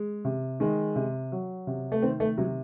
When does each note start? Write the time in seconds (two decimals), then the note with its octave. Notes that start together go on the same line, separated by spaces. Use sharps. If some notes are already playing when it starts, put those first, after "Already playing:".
Already playing: G#3
0.25 C3
0.60 D#3 G#3
0.96 C3
1.32 F#3
1.67 C3
1.92 A3
2.02 D#3 C4
2.20 A3
2.37 C3 F#3